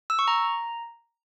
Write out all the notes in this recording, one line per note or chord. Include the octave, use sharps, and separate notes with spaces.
E6
C#6
A#5